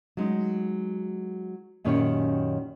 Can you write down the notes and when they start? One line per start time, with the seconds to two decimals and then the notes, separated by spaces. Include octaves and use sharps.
0.17 F#3 G#3 D#4
1.84 F#2 A#2 D#3 C#4 G4 C#5